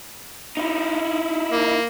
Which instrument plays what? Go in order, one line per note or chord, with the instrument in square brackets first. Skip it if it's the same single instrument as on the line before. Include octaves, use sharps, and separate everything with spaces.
[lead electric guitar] D#4 E4
[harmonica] A#3